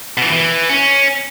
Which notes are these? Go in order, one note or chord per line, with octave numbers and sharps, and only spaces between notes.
B2 E3
E3
C#4